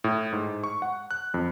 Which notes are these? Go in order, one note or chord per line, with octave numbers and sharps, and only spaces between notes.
A2
G#2
C#6
F#5
F#6
F2